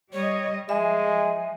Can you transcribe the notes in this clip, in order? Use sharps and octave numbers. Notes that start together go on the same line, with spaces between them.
G3 C#5 D#5
F3 G#3 E5 G#5